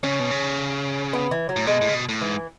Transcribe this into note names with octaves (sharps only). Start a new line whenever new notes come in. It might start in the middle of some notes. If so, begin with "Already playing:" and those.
C#3 C#4
B2
C#3
B3
E3
F#3
A2
B2 G#3
A2
C#3
B2
A2
G#2 E3